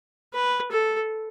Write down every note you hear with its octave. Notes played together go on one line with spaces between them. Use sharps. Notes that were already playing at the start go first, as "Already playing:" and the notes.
B4
A4